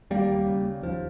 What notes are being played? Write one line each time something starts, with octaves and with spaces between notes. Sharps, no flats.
D#2 G3 A#3
C#3
D#2 F3